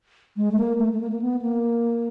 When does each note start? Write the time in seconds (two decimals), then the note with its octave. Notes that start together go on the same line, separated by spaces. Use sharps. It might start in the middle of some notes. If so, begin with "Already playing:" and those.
0.37 G#3
0.52 A3
0.58 A#3
0.79 A3
0.93 A3
1.00 A#3
1.11 A#3
1.22 B3
1.42 A#3